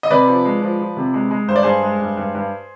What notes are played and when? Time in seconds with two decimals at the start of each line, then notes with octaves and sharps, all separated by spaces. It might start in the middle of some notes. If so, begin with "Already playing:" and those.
0.03 D#5
0.10 C3 B4 D5
0.28 F3
0.45 G#3
0.62 F3
0.80 F3
0.97 C3
1.14 G#3
1.31 G#3
1.48 G2 C5
1.56 D5
1.63 G2 G#4 C5
1.83 G#3
2.00 G2
2.17 G2
2.35 G2